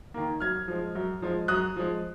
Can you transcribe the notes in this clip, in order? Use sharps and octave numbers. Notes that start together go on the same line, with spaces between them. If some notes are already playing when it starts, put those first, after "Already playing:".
D#3 A#3
F#2 F6 G#6
F3 G#3
F#2
F3 G#3
F#2 D#6 F#6
F3 G#3